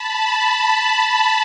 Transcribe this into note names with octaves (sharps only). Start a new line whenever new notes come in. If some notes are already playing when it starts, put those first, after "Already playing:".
Already playing: A5 B5
A5 B5
A5 B5